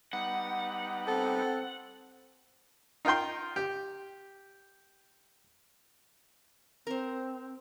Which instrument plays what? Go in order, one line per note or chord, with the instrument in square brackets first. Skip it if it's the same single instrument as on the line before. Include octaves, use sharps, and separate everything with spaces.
[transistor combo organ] G3 B3 D#4 [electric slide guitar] F#5
[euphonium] C4 [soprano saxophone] A4
[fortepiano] D#4 F4 A#4 G5 C6
G4
[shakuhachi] C4 [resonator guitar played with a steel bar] A#4 C5